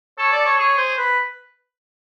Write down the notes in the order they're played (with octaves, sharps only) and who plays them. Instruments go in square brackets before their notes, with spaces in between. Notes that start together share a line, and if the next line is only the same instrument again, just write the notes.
[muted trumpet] A4 [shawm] C#5
[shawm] D5
C#5
[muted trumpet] G#4 [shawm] C#5
[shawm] C5
B4